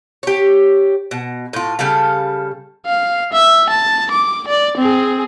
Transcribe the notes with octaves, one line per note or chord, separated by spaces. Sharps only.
G4 C#5
B2
A2 F4
C#3 G3 A4 F5
F5
E5
A5
D6
D5
C4 G#4